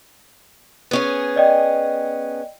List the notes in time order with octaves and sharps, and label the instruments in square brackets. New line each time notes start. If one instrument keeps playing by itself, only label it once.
[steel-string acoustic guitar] B3 C#4 G#4
[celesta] D5 D#5 G5